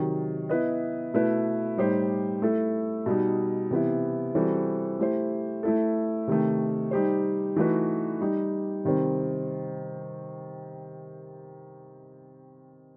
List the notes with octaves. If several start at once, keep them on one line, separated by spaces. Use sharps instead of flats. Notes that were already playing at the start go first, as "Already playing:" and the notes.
Already playing: C3 D#3 F#3
B3 E4 B4 D#5
B2 A3 E4 B4
A2 G3 D#4 G4 C5
A3 E4 A4
B2 G3 D#4
C3 E3 B3 E4
E3 G3 C4 F#4 A4
A3 E4 G4 C5
A3 E4 A4
C3 D#3 A3
G3 D#4 G4 C5
E3 A3 D#4 F#4 B4
G3 D#4 G4
C3 D#3 G3 C4